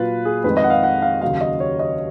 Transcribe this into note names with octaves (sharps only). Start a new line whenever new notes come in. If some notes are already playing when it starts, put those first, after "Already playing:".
Already playing: A#2 F#3 F4 B4
G#4
F2 D#3 G#3 B4
D#5
F#5
F5
F#5
F5
D#2 C#3 F#3 F5
D#5
C#5
D#5